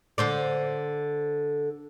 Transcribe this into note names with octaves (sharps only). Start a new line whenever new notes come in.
D3 C5 D5